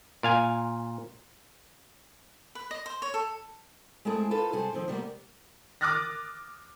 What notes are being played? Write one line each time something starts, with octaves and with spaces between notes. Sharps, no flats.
A#2 F5 G#5
B4
D#5
C5
C#5
A4
G#3 A3 C4 E4 G#4 A4
D#4 F4 A4 B4
C3 G3 G#4 A4 C5
D#3 F3 C4
C3 G3 A#3 B3
D6 D#6 F6 F#6 A6 A#6